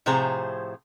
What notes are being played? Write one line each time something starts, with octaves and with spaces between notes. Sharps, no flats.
A2 C3 F3 G#4 C5 A#5